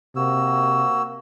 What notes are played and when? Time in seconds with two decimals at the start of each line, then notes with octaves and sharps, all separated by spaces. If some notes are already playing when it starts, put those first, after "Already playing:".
0.16 C3 A#3 F#4 E6